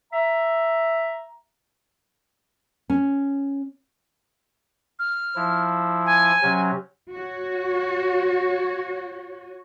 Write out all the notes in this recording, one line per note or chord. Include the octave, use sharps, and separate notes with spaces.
E5 A#5
C#4
F6
F3 E4
G#5
C3 F#3 C#4
F#4 C#5